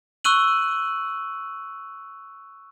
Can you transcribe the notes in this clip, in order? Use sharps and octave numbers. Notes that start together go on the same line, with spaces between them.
C#6 E6 F#6 D#7 F#7